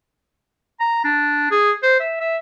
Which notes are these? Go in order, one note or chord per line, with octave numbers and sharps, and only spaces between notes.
A#5
D4
G#4
C5
E5
E5